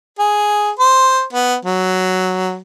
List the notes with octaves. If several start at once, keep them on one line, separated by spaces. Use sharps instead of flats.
G#4
C5
B3
F#3